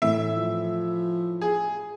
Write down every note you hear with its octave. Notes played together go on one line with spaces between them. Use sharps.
A2 E3 E5
F3
G#4